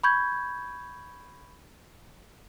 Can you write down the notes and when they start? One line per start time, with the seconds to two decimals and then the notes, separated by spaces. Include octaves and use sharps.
0.04 B5 C#6 G6 G#6